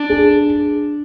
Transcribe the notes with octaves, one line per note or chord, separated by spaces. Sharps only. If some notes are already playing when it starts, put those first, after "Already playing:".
Already playing: D4
G#4